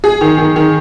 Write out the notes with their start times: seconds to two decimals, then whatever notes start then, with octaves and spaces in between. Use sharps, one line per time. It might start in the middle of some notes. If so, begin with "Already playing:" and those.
0.04 G#4
0.21 D#3
0.38 D#3
0.56 D#3